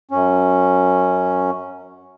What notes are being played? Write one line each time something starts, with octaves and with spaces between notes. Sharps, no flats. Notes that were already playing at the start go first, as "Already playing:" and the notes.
F#2 C#4